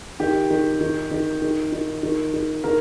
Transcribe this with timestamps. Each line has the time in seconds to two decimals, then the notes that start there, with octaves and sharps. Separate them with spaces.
0.20 D#3 G4
0.50 D#3
0.81 D#3
1.11 D#3
1.42 D#3
1.72 D#3
2.03 D#3
2.34 D#3
2.64 D#3 A#4